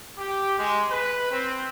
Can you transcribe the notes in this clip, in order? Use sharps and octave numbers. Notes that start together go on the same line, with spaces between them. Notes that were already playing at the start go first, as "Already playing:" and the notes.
G4
G#3
B4
C4